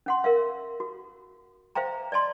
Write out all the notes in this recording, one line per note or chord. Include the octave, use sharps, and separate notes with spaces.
C#4 F#5 C6
A#4 E5 F5
F#4
C5 E5 F5 G5 A#5
D5 D#5 A5 C6